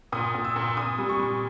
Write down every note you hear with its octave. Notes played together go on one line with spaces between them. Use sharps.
A#2 D#6
A#2
E6
A#2
A#2 D#6
G3
C#6
G3